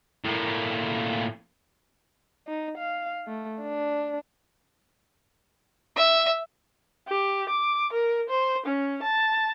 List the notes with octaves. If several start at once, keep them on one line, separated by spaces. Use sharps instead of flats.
A2 A#3
D#4
F5
A3
D4
E5
G4
D6
A#4
C5
C#4
A5